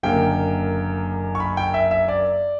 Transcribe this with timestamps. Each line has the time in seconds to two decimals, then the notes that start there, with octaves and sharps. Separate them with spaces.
0.03 F#1 F#2 D3 A#3 G5
1.35 C#6
1.40 B5
1.57 G5
1.74 E5
1.91 E5
2.08 D5